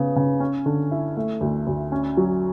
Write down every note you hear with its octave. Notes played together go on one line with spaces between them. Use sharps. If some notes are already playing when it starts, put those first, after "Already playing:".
Already playing: C#3 B3
C#3
C#4
D3
E4
A3
D2
D2
C#4
F#3